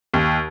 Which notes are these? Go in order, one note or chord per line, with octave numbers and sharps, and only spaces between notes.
D#2